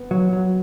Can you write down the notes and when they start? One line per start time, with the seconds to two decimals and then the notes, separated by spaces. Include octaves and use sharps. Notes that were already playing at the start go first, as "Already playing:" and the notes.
Already playing: B3
0.11 F#3
0.33 F#3